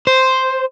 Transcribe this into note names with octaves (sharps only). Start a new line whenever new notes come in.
C5